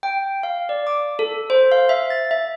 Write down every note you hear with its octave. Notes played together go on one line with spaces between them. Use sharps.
G5
F5
D5
D6
A4
C5
F5
E5
A6
E5